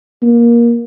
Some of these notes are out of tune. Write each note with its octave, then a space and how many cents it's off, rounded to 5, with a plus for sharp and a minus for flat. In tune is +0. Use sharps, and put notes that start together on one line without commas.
A#3 +20